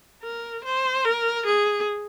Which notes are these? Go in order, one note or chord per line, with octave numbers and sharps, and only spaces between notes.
A#4
C5
A#4
G#4